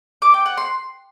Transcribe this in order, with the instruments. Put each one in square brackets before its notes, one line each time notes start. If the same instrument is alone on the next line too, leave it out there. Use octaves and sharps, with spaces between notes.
[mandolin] D6
G5
F#5
C6